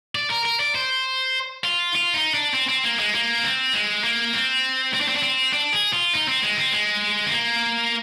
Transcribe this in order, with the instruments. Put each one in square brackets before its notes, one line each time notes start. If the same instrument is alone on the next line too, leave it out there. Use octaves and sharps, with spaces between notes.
[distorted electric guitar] D5
A#4
A#4
D5
C5
F4
F4
D#4
D4
C4
C4
A#3
G#3
A#3
C4
G#3
A#3
C4
C4
D4
C4
D4
C4
D4
G#4
F4
D#4
C4
G#3
C4
G#3
C4
A#3